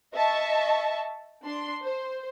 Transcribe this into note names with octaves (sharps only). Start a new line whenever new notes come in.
D#5 E5 A5 C#6
D4 C6
C5